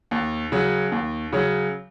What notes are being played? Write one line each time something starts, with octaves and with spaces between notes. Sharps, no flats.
D#2
C#3 F#3
D#2
C#3 F#3